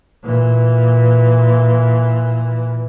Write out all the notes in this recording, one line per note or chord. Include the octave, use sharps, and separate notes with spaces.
A#2 E3